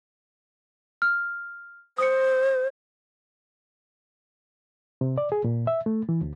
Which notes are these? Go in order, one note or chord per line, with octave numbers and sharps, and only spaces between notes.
F6
C5 D#6 C#7
C3
D5
G#4
A#2
E5
A3
E3
D2